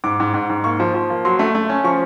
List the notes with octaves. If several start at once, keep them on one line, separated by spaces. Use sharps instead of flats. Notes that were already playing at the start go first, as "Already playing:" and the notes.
G#2 D6
G#2
G#2
G#2
A#3 C#6
F3
F3
A#3
F#3 C6
A3
A3
C#4
F3 C#6